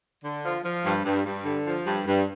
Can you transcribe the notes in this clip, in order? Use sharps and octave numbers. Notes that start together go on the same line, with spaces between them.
D3
F3
F3
G2
G2
G2
D3
F3
G2
G2